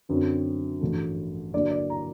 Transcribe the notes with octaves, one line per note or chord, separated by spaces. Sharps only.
F#2 D3 F#3 C4
A1 G2 F#3 A3
G2 D3 F#3 A#3 D5
D5
A#5